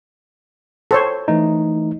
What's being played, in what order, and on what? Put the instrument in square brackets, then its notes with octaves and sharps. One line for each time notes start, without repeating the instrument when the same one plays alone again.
[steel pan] A4 C5 C#5
[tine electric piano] E3 A3 D#4